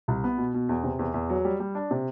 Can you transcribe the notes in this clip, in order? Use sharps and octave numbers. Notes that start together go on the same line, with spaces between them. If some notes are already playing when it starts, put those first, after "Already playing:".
C2
B3
B2
B2
E2
C3
E2
E2
F#3
G3
G3
D4
C3